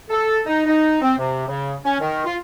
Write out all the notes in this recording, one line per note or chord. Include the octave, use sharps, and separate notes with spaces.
A4
D#4
D#4
C4
C3
C#3
C#4
D#3
F4